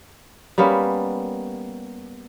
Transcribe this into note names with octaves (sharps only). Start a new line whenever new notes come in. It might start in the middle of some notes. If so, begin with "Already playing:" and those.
G3 A#3 B3 C#4